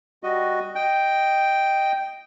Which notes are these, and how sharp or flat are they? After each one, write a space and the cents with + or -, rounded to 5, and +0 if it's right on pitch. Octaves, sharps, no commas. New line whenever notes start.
G3 +0 F#4 +0 D#5 +0
D#5 -5 G5 +0